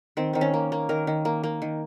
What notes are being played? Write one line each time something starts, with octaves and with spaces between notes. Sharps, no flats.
D#3 C4
D#3 C4
C#4
A#3
A#3
D#3 A#4
D#3
A#3
A#3
D#3